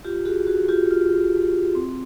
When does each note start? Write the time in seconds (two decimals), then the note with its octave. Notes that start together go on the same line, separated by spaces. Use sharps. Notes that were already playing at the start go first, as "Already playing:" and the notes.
0.04 F4 G4
0.25 F#4 G#4
0.47 F#4 G#4
0.69 F4 G4
0.91 F4
1.75 C4